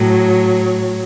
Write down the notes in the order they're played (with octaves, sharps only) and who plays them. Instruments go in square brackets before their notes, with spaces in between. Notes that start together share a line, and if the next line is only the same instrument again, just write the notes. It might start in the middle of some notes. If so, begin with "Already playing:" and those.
Already playing: [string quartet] A2 F#3
C#5